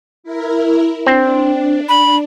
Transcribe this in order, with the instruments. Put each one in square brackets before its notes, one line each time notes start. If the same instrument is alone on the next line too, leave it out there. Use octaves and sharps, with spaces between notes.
[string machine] E4 A#4
[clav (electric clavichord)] C4 [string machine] D4
[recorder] B5